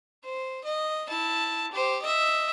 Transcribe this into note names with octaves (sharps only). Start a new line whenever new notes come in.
C5
D#5
E4 A5
G4 C5
D#5 E5